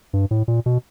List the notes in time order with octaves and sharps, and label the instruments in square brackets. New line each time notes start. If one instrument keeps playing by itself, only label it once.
[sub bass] G2
A2
A#2
B2